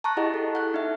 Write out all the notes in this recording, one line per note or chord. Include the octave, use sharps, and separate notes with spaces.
A5 A#5 C#6 F#6
E4 G4 G#4 D#5 F#5
A4
F#5 F#6
D#4 E5